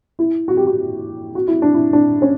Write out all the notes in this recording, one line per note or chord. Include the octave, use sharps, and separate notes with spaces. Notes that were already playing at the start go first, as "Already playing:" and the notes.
E4
F#4
G4
F#4
F#4
E4
D4
E4
D4
C#4